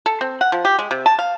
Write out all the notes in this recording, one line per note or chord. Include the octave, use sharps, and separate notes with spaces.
A4
C4
F#5
F3
G4
G#3
C3
A5
F5